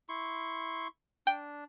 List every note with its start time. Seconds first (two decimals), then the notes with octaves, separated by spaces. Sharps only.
0.09 E4 C6 C#6
1.27 D4 G5